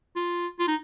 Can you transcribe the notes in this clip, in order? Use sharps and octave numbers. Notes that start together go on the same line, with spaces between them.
F4
F4
D#4